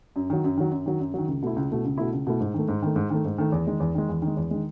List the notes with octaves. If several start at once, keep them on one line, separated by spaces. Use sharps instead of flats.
F#2
D#3 F#3
F#2
D#3 F#3
F#2
D#3 F#3
F#2
D#3 F#3
C#2
B2 A3 E4
C#2
B2 A3 E4
C#2
B2 A3 E4
C#2
B2 A3 E4
G#2
D#3 A3
G#2
D#3 A3
G#2
D#3 A3
G#2
D#3 A3
E2
D#3 G#3
E2
D#3 G#3
E2
D#3
G#3
E2
D#3 G#3